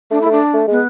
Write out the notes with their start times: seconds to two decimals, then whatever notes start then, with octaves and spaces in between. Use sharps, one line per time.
0.11 A3 D4
0.21 A3 E4
0.32 D4
0.54 A3
0.68 G#3 B3